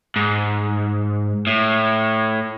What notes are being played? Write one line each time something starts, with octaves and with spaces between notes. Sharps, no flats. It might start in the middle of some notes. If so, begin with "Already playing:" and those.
G#2
A2